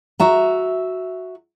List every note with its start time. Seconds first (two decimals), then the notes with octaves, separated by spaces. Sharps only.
0.19 F#4 E5 A#5